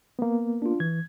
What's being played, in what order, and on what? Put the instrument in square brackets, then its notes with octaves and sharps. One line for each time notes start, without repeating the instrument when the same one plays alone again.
[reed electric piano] A#3 B3
[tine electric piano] D4 F4
[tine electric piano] E3 [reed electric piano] G#6